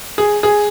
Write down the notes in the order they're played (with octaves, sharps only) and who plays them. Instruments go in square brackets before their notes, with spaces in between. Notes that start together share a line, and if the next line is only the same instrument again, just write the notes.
[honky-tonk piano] G#4
G#4